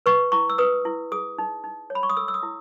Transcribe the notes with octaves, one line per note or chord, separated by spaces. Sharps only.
B4 C#6
E4 C#6
E6
B4 D#6
E4
G#4 D#6
D#4
D#4
C#5
B5
C#6
D#6
A4 E6
E6
D#6
E4